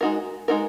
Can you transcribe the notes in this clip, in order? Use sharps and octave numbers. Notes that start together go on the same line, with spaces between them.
G#3 D#4 F#4 A#4
G#3 D#4 F#4 A#4